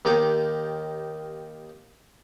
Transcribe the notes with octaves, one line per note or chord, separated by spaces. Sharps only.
D#2 D#3 D#4 G4 D6